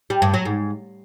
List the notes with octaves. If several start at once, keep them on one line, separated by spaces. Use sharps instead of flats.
G3
G2
F#3
G#2